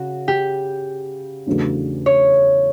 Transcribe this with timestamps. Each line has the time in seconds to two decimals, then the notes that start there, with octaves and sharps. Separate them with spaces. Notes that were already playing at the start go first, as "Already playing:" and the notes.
Already playing: C#3 F#4
0.28 G4
1.47 E2 C#3 F#3 A3 D4
2.06 C#5